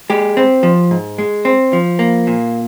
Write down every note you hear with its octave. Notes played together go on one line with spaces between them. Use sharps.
G#3 G4
C4
F3
G#2
G#3
C4
F3
A#3
A#2